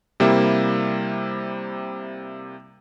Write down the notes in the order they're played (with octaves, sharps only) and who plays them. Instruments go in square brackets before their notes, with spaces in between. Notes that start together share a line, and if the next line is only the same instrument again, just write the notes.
[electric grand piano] C3 G3 A#3 E4